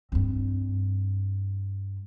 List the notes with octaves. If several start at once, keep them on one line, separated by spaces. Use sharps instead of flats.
G2 C4